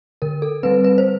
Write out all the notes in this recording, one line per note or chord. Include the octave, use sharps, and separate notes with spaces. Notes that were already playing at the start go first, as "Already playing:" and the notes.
D3 A#4
A4
G3 C4 B4
B4
C5